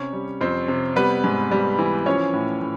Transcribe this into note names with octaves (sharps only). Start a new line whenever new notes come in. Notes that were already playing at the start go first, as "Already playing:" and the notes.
Already playing: C3 C#4 C#5
G3
F2 C4 C5
C3
G3 B3 B4
G#2
G3
E3
F3 C#4 C#5
A2
A2